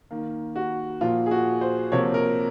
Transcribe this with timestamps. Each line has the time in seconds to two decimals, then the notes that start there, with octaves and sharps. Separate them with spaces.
0.11 D#3 A#3
0.56 F#4
1.01 A#2 F3 A#3 F4
1.26 G#4
1.31 F#4
1.61 C5
1.92 C3 F3 A#3 C#5
2.14 A#4